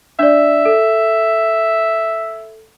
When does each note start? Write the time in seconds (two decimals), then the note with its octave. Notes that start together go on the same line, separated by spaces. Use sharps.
0.19 D4 D5 E5
0.65 A4